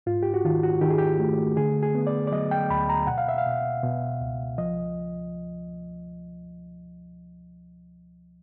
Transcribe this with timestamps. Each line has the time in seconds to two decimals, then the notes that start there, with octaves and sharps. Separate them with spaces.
0.06 G#2 F4
0.23 G4
0.34 F#4
0.45 D#3 F4
0.63 F#4
0.81 D#3 G4
0.90 G#4
0.98 G4
1.19 A3
1.57 D3 G#4
1.83 G#4
1.95 B3
2.07 D5
2.27 D5
2.32 F#3 D#5
2.51 G5
2.70 D2 B5
2.89 A#5
3.07 B2 F#5
3.18 F5
3.29 E5
3.38 F5
3.46 B2
3.83 B2
4.21 C#2
4.58 F3 D#5